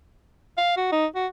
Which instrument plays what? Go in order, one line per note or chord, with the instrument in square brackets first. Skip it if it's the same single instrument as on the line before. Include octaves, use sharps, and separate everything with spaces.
[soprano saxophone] F5
F#4
D#4
F#4